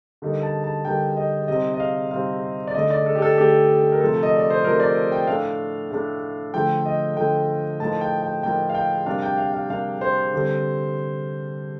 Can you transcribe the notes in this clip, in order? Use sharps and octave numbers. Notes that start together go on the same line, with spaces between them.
D3 G3 A#3 D#4
A5
A5
D3 G3 A#3 D#4 G5
D#5
C3 G3 C4 D#4 D#5
D#5
F5
C3 G3 C4 D#4 F5
D5
D3 A3 D#4 D#5
D5
A4
G4
A4
D3 A3 D#4 G4
A#4
C3 F3 A3 A4
D#5
D5
C5
C3 F3 A3 A#4
D5
G5
A2 A3 D4 F5
A2 A3 D4
D3 F3 A3 G5
D#5
D3 F3 A3 G5
A2 F3 A#3 D#4 A5
G5
G5
A2 F3 A#3 D#4 G5
F5
G5
C3 G3 A#3 D4 F5
G5
F5
F5
C3 G3 A#3 D4 F5
C5
D3 G3 C4